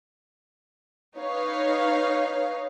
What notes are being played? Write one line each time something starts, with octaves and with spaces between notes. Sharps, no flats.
D#4 B4 C#5 F5